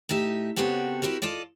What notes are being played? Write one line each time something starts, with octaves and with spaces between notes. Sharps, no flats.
A2 D#4 G4 E5
C#3 B3 C4 F#4 G4 A4
C4 E4 F#4 G4 A#4
F4 A4 D5 D#5